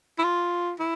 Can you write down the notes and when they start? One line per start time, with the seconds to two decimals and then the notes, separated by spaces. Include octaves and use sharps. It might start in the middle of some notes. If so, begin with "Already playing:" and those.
0.18 E4
0.24 F4
0.79 E4